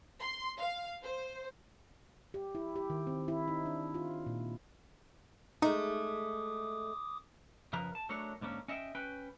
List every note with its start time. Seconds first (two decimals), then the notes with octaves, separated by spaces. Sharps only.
0.20 C6
0.58 F5
1.03 C5
2.34 G4
2.55 E4
2.76 G4
2.90 D#3
3.07 C4
3.28 E4
3.48 D#4
3.66 D4
3.94 F4
4.26 A#2
5.62 G#3 A3 D#4 D6 D#6
7.73 F#2 C#3 F3 A#4 B4 A#5
7.95 A5
8.09 F#3 A3 D4 A#4 C#5
8.41 G#2 D3 A#3 C#4
8.68 C#4 D#5 E5 F#5 G5
8.95 C#4 B4 G5